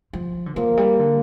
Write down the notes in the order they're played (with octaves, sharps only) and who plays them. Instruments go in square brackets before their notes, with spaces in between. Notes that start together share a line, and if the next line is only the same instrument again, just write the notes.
[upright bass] F3
D3
[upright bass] F3 [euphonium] A#3
[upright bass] G3
D3